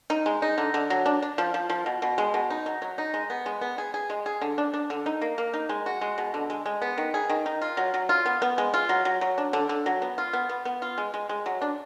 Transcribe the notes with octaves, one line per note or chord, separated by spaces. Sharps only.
D#4
G#3
D#4
D3
D3
F#3
D4
D4
F3
F3
F3
B2
B2
G#3
B2
D#4
F#3
F#3
D#4
G#3
B3
G#3
B3
G#4
G#4
G#3
G#4
D3
D4
D4
D3
D#4
A#3
A#3
D#4
G#3
F#4
G#3
B2
D3
G#3
G#3
B3
D#3
G#4
D#3
D#4
F4
F#3
F#3
F4
B3
B3
G#3
F4
F#3
F#3
F#3
D4
D3
D3
F#3
B3
F4
B3
B3
B3
F4
G#3
G#3
G#3
F#3
D4